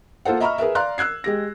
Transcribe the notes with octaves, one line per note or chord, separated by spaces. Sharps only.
A#3 F4 A4 C5 F#5
D#5 E5 A#5 B5 C#6 F6
G#4 A#4 B4 E5
D5 F5 A#5 C6 F#6
E6 F#6 G#6 C7
G#3 G4 A#6